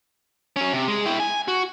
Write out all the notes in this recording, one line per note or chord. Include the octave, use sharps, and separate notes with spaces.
F#3 C#4
C3
G#3
E4 G5
G#5
F#4